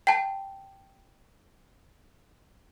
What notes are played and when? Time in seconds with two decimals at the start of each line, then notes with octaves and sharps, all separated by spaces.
0.07 G5 A5